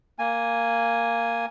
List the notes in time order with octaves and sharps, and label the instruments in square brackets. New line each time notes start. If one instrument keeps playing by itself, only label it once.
[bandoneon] A#3 G#5